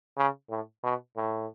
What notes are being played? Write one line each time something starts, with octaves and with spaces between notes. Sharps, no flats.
C#3
A2
B2
A2